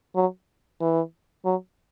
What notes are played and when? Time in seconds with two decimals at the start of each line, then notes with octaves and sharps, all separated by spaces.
0.16 F#3
0.81 E3
1.45 F#3